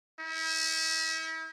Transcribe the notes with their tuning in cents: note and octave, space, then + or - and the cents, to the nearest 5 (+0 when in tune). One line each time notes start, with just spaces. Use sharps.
E4 -40